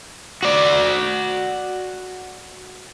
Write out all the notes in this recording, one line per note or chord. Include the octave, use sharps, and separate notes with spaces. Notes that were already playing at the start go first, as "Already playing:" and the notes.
F#4 D5